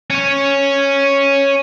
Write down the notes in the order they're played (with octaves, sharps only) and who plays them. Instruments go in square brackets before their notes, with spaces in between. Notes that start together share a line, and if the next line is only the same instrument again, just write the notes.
[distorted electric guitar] C#4 C#5